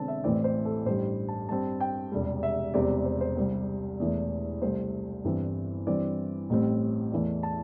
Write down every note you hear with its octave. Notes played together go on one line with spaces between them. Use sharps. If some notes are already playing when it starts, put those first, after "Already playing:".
Already playing: E1 E2 D3 C4 A5
E5
A1 A2 E3 C4 D5
C5
A4
A1 G2 G3 C5
A5
G2 G3 C4 A5
G5
E1 E2 C3 G3
E5
E1 E2 C3 G3 C4 D5
D5
C5
C5
C2 C3 G3
E1 E2 E3 A3
C2 C3 A3 C5
G1 G2 E3 C4
G2 E3 C4 D5
A1 A2 G3 C4
E2 E3 A3
A5